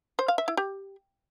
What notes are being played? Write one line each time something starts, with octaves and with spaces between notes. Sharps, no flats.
C5
F5
E5
E4
G4